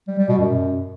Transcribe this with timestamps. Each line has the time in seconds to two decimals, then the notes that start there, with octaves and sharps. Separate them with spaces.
0.08 G3
0.18 G3
0.28 B2
0.39 F#2